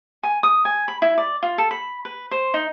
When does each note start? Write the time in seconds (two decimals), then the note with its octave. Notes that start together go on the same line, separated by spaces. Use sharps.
0.23 G#5
0.43 D#6
0.65 G#5
0.88 B5
1.02 E4
1.18 D5
1.43 F4
1.58 A4
1.71 B5
2.05 B4
2.31 C5
2.54 D#4